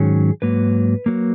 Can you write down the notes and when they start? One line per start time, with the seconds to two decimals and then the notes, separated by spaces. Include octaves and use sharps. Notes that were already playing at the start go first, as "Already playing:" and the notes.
Already playing: G#2 D#3 F#3 C#4 G#4
0.42 G#2 F#3 A#3 B4
1.06 F#3 A#3